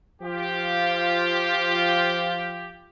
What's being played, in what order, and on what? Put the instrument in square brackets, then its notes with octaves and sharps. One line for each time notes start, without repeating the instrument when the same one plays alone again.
[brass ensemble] F3 F4 G4